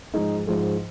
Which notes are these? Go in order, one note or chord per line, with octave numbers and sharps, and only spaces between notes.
G#2 F3 G#3 D#4
G#2 F3 G#3